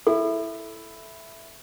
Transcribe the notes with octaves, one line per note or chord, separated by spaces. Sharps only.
E4 A4